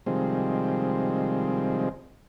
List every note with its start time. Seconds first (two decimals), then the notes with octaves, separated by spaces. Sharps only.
0.06 C3 D#3 F3 G3 G#3 C4